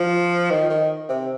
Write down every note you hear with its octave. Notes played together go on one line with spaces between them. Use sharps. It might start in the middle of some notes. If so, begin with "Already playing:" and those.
Already playing: F3
D#3
D#3
C3